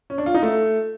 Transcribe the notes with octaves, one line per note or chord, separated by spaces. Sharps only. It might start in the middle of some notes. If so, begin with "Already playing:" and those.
C#4
D4
F4
D#4
A3